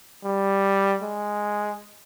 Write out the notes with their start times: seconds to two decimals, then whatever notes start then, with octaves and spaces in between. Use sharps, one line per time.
0.24 G3
1.02 G#3